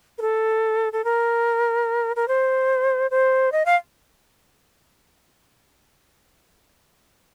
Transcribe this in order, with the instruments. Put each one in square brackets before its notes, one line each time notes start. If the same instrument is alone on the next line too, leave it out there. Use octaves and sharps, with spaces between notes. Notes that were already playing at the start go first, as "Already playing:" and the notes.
[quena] A#4
A4
A4
A#4
A#4
C5
C5
D#5
F5